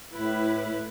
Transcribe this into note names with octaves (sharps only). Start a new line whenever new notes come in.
A2 E4 B4